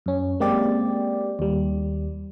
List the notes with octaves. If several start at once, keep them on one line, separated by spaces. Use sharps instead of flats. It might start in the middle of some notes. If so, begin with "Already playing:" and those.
F#2 C#4
G#3 A#3 C4 G4 D5
D#2 G3